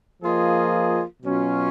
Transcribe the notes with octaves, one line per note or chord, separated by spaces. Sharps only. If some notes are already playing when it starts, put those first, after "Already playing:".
F3 A#3 F4 G#4 D#5
B2 F#3 C#4 F4